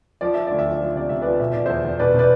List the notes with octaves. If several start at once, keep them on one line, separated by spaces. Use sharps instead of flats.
F3 D5
F3 E5
D2 D5
E5
F3
D5
F3 E5
C3 D5
C3 E5
F3 B4 D5
B2 E5
B2 D5
E2 C5 E5
E2
B2 B4 D5
B2
B4 D5